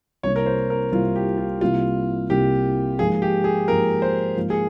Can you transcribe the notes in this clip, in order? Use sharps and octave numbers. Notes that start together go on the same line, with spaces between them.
C2 C3 G3 A#3 E4 C#5
A#4
C5
A#4
C2 C3 G3 A#3 E4 F4
G4
F4
C2 C3 G3 A#3 E4 F4
C2 C3 G3 A#3 E4 G4
G#2 F3 A#3 F4 G#4
G4
G#4
G#2 F3 A#3 F4 A#4
C5
G#2 F3 A#3 F4
G#4